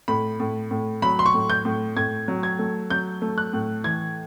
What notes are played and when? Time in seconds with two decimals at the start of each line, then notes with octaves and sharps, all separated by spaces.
0.08 A2 B5
0.40 A2
0.71 A2
1.02 F#3 B5
1.19 C6
1.26 C#6
1.34 A2
1.50 G6
1.65 A2
1.96 A2 G#6
2.28 F#3
2.43 G#6
2.59 A3
2.90 F#3 G6
3.22 A3
3.38 F#6
3.53 A2
3.84 E3 G#6